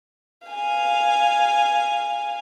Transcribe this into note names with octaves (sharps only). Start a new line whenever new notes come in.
F5 G#5